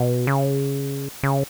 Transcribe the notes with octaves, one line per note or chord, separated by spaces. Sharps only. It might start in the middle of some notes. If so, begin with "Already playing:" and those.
Already playing: B2
C#3
C#3